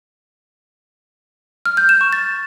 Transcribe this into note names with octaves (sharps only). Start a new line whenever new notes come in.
F6
G6
E7
C#6
A6